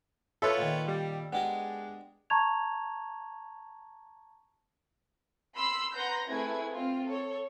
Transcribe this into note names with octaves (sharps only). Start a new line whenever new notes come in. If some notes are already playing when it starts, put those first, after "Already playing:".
F4 A4 B4 C#5 E5
A#2 D#3
G3
G#3 B3 D4 G4 A#4
A5 A#5 C#6 G#6 F7
B5 C6 E6 C7
B4 F#5 A#5 C6 G6 A#6
A3 C4 E4 G#4 B4 G#6
C4 F4
A4 C#5